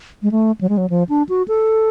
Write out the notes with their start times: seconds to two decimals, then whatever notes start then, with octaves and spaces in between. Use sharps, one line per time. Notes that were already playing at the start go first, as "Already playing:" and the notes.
0.23 G#3
0.31 A3
0.61 F#3
0.69 G#3
0.78 F#3
0.90 F3
1.09 D4
1.29 F#4
1.48 A4